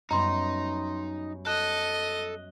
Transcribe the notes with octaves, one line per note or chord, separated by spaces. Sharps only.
F#2 G3 B3 D#4 A#5 C6
A4 D#5 F#6